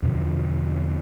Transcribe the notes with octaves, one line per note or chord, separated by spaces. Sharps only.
E2 B2 D3 F3